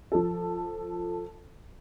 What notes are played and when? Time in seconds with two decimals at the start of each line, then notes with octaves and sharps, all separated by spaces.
0.12 F3 A4